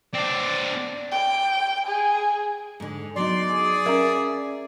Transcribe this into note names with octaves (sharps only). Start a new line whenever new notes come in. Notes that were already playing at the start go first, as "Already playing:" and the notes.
C4 D4 D5
G5
G#4
G#2 D3
F#3 B3 D#4 D5 C6
G#4
C#4 A#4 E5